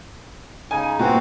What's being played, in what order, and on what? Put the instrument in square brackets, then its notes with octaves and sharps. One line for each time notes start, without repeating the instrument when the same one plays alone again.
[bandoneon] C#3 D#4 [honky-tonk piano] G#5
[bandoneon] G2 C4 F#4 [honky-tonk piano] A#2